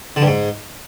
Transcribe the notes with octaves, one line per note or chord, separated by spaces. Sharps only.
D3
G2
G#2